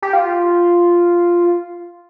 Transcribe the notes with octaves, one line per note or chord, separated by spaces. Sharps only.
G4
F4